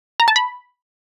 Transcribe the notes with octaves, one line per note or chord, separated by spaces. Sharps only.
A#5
A5
B5